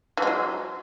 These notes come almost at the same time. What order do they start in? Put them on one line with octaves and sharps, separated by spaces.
E3 G#3 F#3